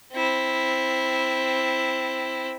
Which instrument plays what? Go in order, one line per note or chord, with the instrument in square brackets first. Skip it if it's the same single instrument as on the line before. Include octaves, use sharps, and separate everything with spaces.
[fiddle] C4 E4